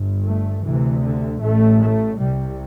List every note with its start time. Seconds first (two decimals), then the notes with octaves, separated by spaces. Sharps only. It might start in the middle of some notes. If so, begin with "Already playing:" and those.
Already playing: G1 G2
0.26 A3
0.64 D2 C3 E3
1.03 D3
1.41 A1 A2 A3
1.81 A3
2.19 C2 C3 G3